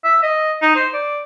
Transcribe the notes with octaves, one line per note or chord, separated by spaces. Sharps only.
E5
D#5
D#4
C5
D5